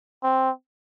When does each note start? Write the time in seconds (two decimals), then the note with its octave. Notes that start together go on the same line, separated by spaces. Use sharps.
0.23 C4